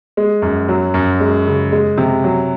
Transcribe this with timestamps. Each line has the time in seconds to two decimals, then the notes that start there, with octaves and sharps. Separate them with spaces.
0.17 G#3
0.42 F#2
0.68 F#3
0.94 F#2
1.20 G#3
1.47 C#3
1.72 G#3
1.98 C3
2.24 F#3